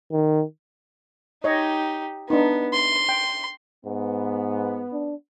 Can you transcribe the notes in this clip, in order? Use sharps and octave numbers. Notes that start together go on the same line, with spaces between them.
D#3
D#4 G4 C#5 D#5
B3 D4 D#4
C6
G5
G#2 B3
D4